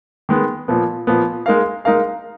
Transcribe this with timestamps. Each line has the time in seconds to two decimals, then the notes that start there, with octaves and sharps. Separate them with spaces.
0.29 D#3 G#3 B3
0.68 A#2 F3 B3
1.07 A#2 F3 B3
1.46 G#3 D#4 A#4 F5
1.85 G#3 D#4 A#4 F5